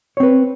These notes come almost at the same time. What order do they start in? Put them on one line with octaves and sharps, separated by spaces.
C#5 C4 B4